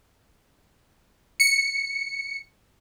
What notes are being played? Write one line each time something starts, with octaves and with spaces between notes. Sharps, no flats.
C#7